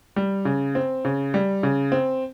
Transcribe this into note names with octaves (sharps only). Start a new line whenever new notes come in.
G3
C#3
C4
C#3
G3
C#3
C4